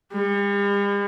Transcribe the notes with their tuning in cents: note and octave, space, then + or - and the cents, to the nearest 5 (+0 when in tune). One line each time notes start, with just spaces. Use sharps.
G3 +45